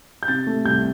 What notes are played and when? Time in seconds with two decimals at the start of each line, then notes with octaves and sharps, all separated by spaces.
0.23 G6
0.28 C3 A6
0.47 A3
0.65 C2 G6